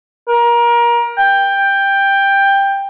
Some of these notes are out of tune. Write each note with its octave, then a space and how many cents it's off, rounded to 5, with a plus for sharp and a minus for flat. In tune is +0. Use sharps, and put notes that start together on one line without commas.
A#4 +25
G5 +10